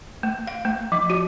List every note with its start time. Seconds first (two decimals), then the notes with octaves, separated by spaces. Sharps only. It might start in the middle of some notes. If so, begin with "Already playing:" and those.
0.23 A3
0.47 F5
0.65 A3
0.92 F3
1.10 F#4